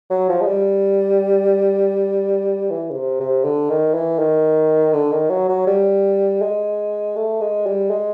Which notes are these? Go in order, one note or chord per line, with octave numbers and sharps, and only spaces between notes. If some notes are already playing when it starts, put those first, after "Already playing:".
F#3
F3
G#3
G3
E3
C#3
C3
C3
D3
D#3
E3
D#3
D3
D#3
F#3
F#3
G3
G#3
A3
G#3
G3
G#3